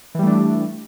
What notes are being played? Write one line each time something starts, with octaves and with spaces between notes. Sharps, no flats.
E3 G3 A3 D4